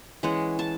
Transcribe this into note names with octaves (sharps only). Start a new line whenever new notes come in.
E3 G#3 C#4 F#5
A5